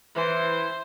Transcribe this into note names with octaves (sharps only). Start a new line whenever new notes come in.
E3 C5